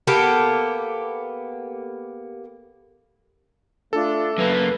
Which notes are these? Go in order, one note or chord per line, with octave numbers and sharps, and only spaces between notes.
A#3 B3 G4 A4
A3 D4 F4 A4
F#2 A#3 B4